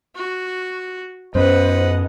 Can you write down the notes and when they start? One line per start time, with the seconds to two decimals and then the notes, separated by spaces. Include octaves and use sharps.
0.16 F#4
1.35 F#2 B3 C#4 B4 C5 D#5 F#5